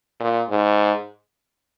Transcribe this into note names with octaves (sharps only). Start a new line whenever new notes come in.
A#2
G#2